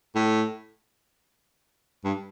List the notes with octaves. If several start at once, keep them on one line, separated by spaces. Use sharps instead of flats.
A2
G2